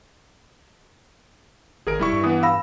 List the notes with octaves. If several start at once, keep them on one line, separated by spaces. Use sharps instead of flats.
G#1 G#4 A#4 D7
E1 G3 E4 C#6
G2
E3 B3 D#6
F5 B5 E6 A#6